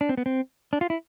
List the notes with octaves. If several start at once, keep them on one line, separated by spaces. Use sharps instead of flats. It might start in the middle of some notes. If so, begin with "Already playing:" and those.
D4
C4
B3
C4
D4
F4
E4